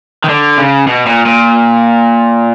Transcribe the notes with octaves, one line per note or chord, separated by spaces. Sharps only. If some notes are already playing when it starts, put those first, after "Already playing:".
D#3
D3
C#3
B2
A#2
A#2